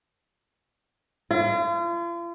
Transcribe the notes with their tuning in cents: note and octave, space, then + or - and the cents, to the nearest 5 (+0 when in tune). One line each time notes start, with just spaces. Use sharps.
F4 -40